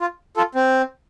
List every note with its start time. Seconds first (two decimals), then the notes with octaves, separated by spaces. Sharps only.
0.01 F4
0.37 F4 A4
0.55 C4